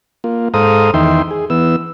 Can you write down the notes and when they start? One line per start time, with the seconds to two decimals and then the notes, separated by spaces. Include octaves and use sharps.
0.24 A#3 F4
0.54 G#2 A4 C5 F5 A#5 D#6
0.94 E2 D#3 D#4 E5 G5 C6
1.31 G#4
1.50 E3 B3 E6